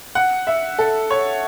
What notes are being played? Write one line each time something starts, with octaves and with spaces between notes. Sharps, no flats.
F#5
E5
A4
C#5